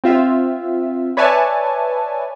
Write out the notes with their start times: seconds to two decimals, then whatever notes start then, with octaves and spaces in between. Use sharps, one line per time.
0.04 C4 F4 E5
1.17 B4 C#5 D5 E5 G#5 A5